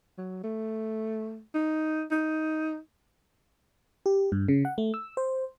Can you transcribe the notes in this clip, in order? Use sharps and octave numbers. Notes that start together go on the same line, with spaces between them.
F#3
A3
D#4
D#4
G4
G2
C#3
F#5
A3
E6
C5